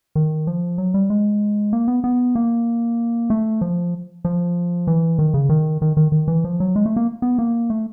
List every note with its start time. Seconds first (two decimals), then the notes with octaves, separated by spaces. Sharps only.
0.15 D#3
0.47 F3
0.78 F#3
0.94 G3
1.10 G#3
1.73 A#3
1.88 B3
2.04 B3
2.35 A#3
3.30 A3
3.61 F3
4.25 F3
4.87 E3
5.19 D#3
5.34 C#3
5.49 D#3
5.82 D#3
5.97 D#3
6.12 D#3
6.28 E3
6.44 F3
6.60 F#3
6.76 G#3
6.86 A3
6.96 A#3
7.22 B3
7.39 A#3
7.70 A3